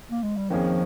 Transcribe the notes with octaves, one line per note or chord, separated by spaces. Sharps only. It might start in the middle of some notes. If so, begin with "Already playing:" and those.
A#3
G#3
G3
F2 D#3 F3 A#3 C#4 G#4